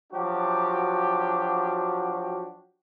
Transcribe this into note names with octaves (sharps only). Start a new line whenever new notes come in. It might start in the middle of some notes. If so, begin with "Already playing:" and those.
F3 F#3 D4 F#4 G4